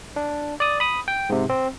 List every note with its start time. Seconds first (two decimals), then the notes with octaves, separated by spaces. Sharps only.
0.16 D4
0.60 D5 D#6
0.80 B5 D#6
1.08 G5
1.29 G#2 C3
1.49 C4